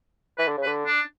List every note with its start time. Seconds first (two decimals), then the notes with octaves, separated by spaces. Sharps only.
0.38 E3 B4
0.48 D3
0.57 C#3
0.63 B4
0.66 D3
0.86 D4